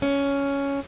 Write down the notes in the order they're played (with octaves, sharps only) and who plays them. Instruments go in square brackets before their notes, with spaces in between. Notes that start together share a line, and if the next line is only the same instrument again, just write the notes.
[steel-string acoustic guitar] C#4